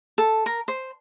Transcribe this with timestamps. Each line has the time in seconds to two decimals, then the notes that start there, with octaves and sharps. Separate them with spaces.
0.18 A4
0.46 A#4
0.68 C5